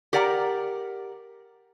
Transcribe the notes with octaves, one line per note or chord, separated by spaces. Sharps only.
G4 A#4 D5 F#5 G#5 A#5